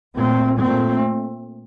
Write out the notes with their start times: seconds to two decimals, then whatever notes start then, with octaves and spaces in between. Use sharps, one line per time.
0.15 A#2 A3 C4
0.58 A#2 A3 C4